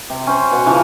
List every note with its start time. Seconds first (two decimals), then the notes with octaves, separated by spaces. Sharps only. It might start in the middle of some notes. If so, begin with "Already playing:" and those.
0.10 C3
0.27 C#4 C5
0.51 B2 F#5
0.65 C#3 E3 F3